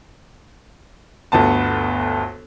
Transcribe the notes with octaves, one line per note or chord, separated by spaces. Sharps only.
G1 D2 B3 A5